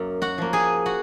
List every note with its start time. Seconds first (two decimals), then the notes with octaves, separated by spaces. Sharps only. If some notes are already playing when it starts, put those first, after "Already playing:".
Already playing: F#2 A#3
0.22 F#4 F#5
0.38 F3 A#3
0.53 G#4 G#5
0.86 F#4 F#5